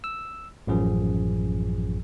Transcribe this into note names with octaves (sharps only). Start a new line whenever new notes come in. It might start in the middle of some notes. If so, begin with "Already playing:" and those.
E6
A1 F#2 F3 G#4